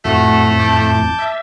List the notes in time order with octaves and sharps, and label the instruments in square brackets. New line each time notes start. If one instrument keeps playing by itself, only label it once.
[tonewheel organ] F2 A2 [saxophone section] F3 A3 [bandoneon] F#4
[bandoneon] A5 D6 G6
[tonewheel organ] E5